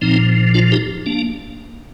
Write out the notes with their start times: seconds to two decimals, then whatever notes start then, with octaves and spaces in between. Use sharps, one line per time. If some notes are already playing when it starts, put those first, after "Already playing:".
0.01 A#2 F3 C4 D#4
0.54 D4 F4
0.72 D#4 G4
1.06 A#3 D4